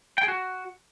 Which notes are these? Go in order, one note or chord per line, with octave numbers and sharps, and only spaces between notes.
G5
G#4
F#4